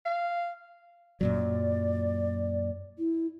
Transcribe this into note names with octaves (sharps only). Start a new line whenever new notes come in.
F5
F#2 A#2 F#3 D5
E4